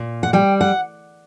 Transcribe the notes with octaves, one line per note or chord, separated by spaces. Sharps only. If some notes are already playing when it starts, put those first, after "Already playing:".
Already playing: A#2
F#5
G3 G5
F#5